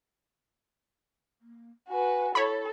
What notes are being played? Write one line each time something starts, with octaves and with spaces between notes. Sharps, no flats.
A#3
F#4 B4 G#5
E4 A4 C#5 B5